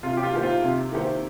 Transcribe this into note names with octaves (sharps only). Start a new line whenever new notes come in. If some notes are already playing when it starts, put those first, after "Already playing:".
C3 F4
G4
F4
D#3 A#3 G4 C5
F4
C3
D#3 A#3 G4 C5